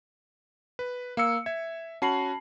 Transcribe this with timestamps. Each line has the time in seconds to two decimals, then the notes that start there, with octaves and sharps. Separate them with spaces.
0.79 B4
1.17 A#3 F5 E6 C#7
1.46 E5 G#6
2.02 C#4 F#4 A5 B5 C7 F#7